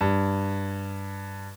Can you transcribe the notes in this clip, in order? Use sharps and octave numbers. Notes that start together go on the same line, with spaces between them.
G2